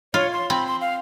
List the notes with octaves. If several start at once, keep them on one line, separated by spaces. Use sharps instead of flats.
F4 C#5
C6
C4 B5
C6
F5